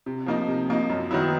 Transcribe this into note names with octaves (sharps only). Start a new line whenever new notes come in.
C3
F3 A#3 D#4
C3
F3 A#3 D#4
F#2
D#3 F#3 B3 E4